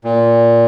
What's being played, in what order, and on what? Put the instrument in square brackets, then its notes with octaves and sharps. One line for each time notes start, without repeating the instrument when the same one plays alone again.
[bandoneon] A#2